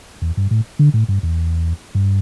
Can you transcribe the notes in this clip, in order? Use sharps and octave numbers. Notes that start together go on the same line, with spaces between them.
E2
G2
A2
D3
A2
G2
E2
G2